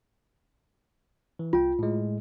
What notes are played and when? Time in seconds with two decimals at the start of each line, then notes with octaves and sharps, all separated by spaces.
1.39 E3
1.53 C2 F4 G5
1.79 A2 G#3